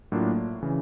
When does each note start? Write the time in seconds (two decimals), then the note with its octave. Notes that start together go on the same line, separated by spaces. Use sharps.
0.12 A2 F#3 A#3 D4 F4
0.63 C#3 E3